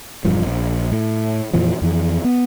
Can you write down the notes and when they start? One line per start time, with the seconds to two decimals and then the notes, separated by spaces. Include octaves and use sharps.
0.25 E1 G2 F3
0.46 A#1
0.92 A2
1.53 F2 A#2 E3 F3
1.82 F2 E3
2.24 B3